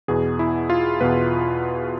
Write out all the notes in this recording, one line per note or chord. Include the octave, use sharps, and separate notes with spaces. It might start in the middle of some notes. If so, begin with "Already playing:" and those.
E2 B2 B3 G#4
E4
F4
E2 B2 B3 B4